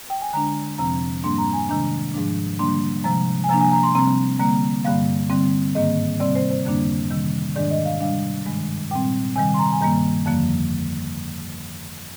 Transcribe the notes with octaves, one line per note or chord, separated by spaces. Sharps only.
G5
G#5
D3 G#3 D4 A#5
F2 C3 F3 C4 A#5
G#2 G3 A#3 D4 C6
A#5
G#5
C3 D#3 G#3 D4 A#5
G#2 F3 G#3 D4
D3 G3 A#3 D4 C6
C3 F3 G#3 A#5
G#5
C3 F3 A#3 D4 A#5
G#5
A#5
C6
C3 G3 C4 A#5
D3 G3 A#3 A#5
G2 D3 G3 A#3 F5
D3 G3 C4
G#2 D#3 A#3 D#5
C3 G3 C4 D5
C5
C5
F2 D3 G3 A#3 D4
C3 D#3 G3
G#2 D#3 G#3 D4 D5
D#5
F5
C3 G3 D4 F5
G2 D#3 G#3
A#2 G3 C4 G5
C3 D#3 G3 G#5
C6
A#5
G#5
G2 D#3 G3 A#3 A#5
F2 D3 F3 A#3